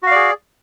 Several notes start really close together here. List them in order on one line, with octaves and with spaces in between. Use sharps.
F#4 F5 D5 G#4